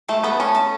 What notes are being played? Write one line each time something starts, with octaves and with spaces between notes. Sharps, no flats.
A3 A5
B3 A4
C#4 C#6
A5